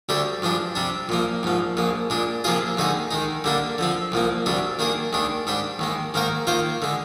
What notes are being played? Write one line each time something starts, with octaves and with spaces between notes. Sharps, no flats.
D2 D3 G3 D4 G4
G2 F3 G#3 D4
C3 G3 D4
A#2 F3 A#3
A#1 G#2 F3
A#1 A#2 G#3
A#2 G#3 D4
C3 F3 A#3 F4 G#4
D#2 D3 G#3 D#4 G#4
D#3 G#3 D#4
D3 G3 A#3 D4
D3 F3 C4
C2 A#2 F3 A#3
D2 C3 G3 D4
D#3 A#3 D4 G#4
D#2 D#3 G#3 D4
G#2 G3 D4 G4
D#2 D#3 G#3
G#2 D#3 A#3 D#4 A#4
D#3 A#3 F4 C5
D3 G#3